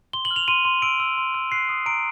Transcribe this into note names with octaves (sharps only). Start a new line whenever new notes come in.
C6 G7
F#7
F6
F7
C6 D#7
C6
E6 D7
E6
C6
E6
F#6 C7
D#6
A#5 D7